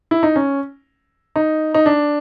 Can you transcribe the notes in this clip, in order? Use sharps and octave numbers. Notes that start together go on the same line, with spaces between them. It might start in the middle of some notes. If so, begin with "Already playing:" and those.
E4
D#4
C#4
D#4
D#4
D4